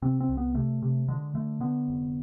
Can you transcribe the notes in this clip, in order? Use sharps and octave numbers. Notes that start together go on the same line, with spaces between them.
C3 C4
C4
C2
B3
C3 A3
C3
D3 G#3
D3 A3
D3 B3
F1